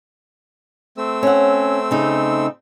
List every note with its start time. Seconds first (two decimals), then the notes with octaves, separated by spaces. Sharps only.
0.97 A3 C4 E6
1.23 C#4 F#5
1.91 C#3 D#4